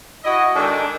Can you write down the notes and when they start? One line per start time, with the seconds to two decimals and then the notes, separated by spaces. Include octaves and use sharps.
0.24 E4 F#4 D#5
0.55 D#3 G#3 D4 A4 G#5